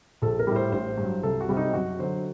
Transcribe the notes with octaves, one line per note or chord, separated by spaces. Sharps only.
A#1 A4
A#4
A2 G3
C5
A1 C5
G2
F#3
C2 A4
F#4
C3 G3
D#4
F#2 F#4
D3 F#3 C5